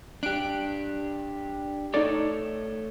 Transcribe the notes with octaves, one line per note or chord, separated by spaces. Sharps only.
D4 G4 F#6 D7
A3 D#4 A4 C#5 D5